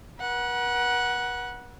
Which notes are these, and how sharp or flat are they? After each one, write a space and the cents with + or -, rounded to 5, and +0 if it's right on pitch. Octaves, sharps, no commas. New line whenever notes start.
B4 -45 F#5 +0